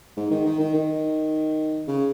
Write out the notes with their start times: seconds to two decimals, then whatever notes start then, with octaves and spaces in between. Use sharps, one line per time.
0.17 G#2
0.31 D#3
0.45 D#3
0.59 D#3
0.74 D#3
1.88 C#3